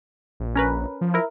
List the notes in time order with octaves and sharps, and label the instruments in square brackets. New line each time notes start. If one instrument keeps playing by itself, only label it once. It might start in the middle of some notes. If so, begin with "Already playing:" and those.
[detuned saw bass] A#1
[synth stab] C#4 A#4 B4
[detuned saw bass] F3
[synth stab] E4 A#4